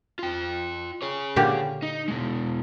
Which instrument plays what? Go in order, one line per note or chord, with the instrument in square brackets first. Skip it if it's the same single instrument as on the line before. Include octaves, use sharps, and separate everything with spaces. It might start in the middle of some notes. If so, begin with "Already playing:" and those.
[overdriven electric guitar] F4 G5
G#4 C#5
[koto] A#2 D3 G4
[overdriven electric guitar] D#4
B2 G#3